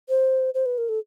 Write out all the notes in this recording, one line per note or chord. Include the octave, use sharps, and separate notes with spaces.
C5
C5
B4
A#4
A4